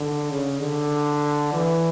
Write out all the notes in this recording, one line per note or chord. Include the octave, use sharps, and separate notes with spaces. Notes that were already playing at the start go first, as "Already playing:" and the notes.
Already playing: D3
C#3
D3
E3